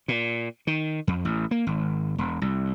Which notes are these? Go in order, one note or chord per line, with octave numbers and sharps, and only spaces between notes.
A#2
D#3
F2
A1
A#3
G#1
E1
C2